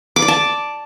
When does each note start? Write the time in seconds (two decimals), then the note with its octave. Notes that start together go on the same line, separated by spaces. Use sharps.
0.16 D6
0.22 D5
0.28 A5